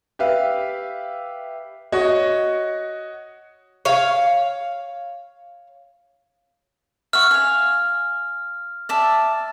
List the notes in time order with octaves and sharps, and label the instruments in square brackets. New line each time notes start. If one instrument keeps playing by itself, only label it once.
[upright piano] G4 B4 E5 F5
[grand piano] F#4 C#5 D#5
[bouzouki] C#5 F5
[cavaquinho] E5 F#5 C#6 [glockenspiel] F6
[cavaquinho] F5 G#5
D5 E5 A5